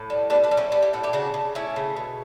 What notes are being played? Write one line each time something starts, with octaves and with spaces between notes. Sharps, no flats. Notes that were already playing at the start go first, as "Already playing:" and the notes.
Already playing: A2
G3
G3 B3 D4
B3 D4
G3
C#4 E4
G3 B3 D4
E4 G4
A2 F#4 A4
E4 G4
C#3 D4 F#4
C#3
A3 C#4 E4
C#3
B2